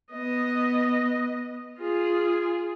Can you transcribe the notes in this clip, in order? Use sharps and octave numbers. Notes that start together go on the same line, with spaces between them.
B3 D#5
F4 G#4